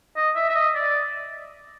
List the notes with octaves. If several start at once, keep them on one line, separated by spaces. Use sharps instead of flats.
D#5
E5
E5
D#5
D5